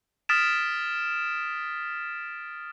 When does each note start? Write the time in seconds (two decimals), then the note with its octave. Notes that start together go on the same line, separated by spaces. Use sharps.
0.29 D#6 F6 A6 B6 D7 E7